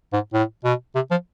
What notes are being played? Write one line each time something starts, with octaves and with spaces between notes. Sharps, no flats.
G#2
A2
B2
C3
F3